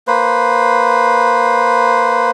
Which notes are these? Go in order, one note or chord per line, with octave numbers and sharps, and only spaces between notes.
A#3 B4 C5